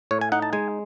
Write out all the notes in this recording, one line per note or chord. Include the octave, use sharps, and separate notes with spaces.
A2 C#5
G#5
D#4 F#5
A5
G#3 G#5